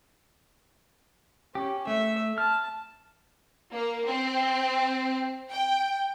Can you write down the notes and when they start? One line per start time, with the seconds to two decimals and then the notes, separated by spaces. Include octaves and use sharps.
1.55 C#4 G4
1.87 A3 E5
2.38 A5 F6
3.74 A#3
4.07 C4
5.51 G5